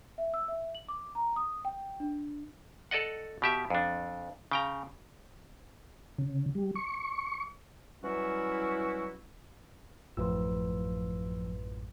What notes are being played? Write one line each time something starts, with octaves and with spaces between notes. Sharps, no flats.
E5
E6
E5
F#7
D6
A#5
D#6
G5
D4
A4 D5 D#5 F#5
B2 G4 E5
F2 D4
C#3 G5 A#5
C#3
G3
C#6
E3 F#3 G3 C#4 E4 F#4
A1 F#2 A2 F3 F4 B4 C6 E6